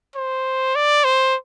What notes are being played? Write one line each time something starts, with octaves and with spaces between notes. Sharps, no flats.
C5
D5
C5